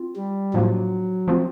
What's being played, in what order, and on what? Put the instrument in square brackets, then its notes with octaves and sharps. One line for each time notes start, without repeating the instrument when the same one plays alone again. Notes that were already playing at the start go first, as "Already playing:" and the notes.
Already playing: [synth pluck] C4 F4
[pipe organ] G3
[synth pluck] A2 F3 A#3 D4 F4 [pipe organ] F#3
[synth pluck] F3 A3 C4 F4